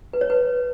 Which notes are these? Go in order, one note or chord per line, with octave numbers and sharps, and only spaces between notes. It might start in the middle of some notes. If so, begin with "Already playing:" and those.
B4
C#5
B4